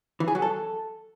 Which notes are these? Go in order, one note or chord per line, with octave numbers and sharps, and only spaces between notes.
E3
G#4
F#3
A4